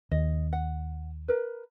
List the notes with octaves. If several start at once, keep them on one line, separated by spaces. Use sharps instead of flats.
D#2 D#5
F#5
A#4 B4